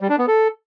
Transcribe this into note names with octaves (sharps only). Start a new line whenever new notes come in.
G3
D4
B3
A4